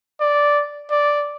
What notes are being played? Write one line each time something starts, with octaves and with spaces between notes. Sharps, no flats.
D5
D5